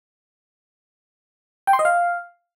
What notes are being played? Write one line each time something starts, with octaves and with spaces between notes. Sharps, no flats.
G5
C6
D#5
F5